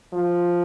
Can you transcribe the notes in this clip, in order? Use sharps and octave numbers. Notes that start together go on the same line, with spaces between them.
F3